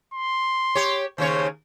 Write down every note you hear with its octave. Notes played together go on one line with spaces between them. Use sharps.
C6
G4 C#5
D#2 C#3 C5 C#5